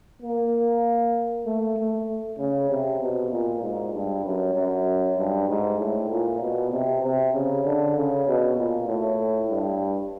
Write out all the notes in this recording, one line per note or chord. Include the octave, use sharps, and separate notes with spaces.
A#3
A3
A3
C#3
C3
B2
A#2
G#2
G2
F#2
F#2
G2
G#2
A2
A#2
B2
C3
C3
C#3
D3
C#3
B2
A#2
A2
G2